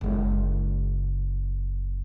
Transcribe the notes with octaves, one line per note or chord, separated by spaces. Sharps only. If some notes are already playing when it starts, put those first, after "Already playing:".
F#1 G#3